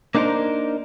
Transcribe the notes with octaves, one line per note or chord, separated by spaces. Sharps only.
A#3 D4 D#4 G#4 A#4 C5